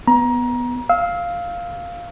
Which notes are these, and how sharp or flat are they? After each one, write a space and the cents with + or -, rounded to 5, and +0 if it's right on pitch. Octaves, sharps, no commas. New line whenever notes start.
B3 +0 A#5 +25
F5 +0 E6 -25